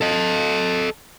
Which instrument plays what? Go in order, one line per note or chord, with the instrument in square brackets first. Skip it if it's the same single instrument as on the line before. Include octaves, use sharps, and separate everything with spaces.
[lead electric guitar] A4 D#5